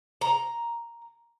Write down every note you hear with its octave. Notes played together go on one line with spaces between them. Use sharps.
A#5